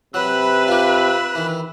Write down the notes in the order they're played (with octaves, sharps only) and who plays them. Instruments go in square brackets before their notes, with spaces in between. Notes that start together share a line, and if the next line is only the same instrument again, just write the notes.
[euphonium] C3 [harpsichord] F#3 [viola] B4 B5 [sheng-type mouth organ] E6 F#6
[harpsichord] F4 G4
D#3 E3